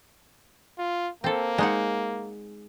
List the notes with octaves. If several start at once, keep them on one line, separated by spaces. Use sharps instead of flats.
F4
A#3 C4 A4
G#3 D#4 F#5